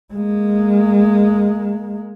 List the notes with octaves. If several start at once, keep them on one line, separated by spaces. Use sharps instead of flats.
G#3 A#3